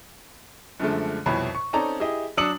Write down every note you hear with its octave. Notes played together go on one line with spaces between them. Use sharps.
F#2 D3 F3 G#3 A3
C2 F2 B2 E4 C#5 B5
C#6
C4 C#4 D#4 A4 D5 A#5
E4 G4 G#4 D#5
F#3 D4 D#6 E6 C#7 F#7